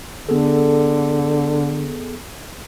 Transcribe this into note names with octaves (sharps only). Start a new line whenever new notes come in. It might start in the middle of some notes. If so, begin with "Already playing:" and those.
D3 B3 G#4 A4